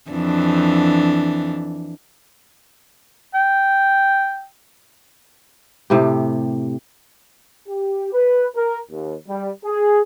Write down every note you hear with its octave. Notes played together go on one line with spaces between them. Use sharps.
F2 E3 D4
G5
A2 C3 G4
G4
B4
A#4
D#2
G3
G#4